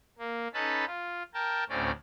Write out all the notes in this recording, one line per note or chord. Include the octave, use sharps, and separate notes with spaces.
A#3
C#4 D#4 A4 B4 A5 B5
F4
A#4 G5 A5
D2 A2 C4 C#4 D5